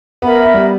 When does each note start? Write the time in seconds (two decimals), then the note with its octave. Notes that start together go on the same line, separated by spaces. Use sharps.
0.22 B3 A#4 E5 B5
0.44 B3
0.54 G3